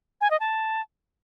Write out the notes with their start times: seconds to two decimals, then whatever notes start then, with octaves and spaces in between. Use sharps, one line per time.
0.21 G#5
0.31 D#5
0.40 A5